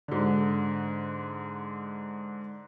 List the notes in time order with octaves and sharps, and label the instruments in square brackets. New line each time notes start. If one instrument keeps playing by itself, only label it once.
[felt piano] G#2 D3